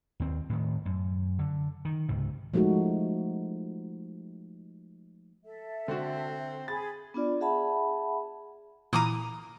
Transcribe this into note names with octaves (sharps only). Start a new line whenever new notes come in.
D#2 C4
A2 D#3
F#2
D3
D#3
C#2 G#2 C3
F3 G#3 A3 D#4 F#4
A4 E5
D3 C4 F#4
G#4 B5 A6
B3 D4 F4 D5
G#4 E5 F#5 A5 B5
A#2 E3 A#5 D6 D#6 D#7